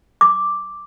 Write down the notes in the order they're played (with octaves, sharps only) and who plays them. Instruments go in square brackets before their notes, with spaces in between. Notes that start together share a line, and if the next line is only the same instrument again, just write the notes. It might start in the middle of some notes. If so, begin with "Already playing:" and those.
[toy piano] D6